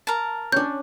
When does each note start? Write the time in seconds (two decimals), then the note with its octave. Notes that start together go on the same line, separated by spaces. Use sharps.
0.07 A#4 A5
0.52 C#4 D4 G6